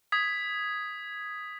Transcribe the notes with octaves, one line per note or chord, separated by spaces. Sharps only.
D#6 G#6 B6